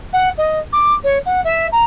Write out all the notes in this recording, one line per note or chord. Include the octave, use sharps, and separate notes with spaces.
F#5
D#5
D6
C#5
F#5
E5
A#5